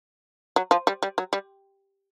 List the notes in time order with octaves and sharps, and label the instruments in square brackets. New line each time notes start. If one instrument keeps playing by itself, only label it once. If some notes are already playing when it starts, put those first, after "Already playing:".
[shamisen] F#3
F3
G3
G3
F#3
G3